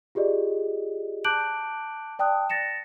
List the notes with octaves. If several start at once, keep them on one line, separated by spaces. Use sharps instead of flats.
F4 G4 G#4 D5 D#5
A5 D6 F#6 G6 D7 F#7
D5 G5 A5 D#6 F#6
A6 A#6 C#7 E7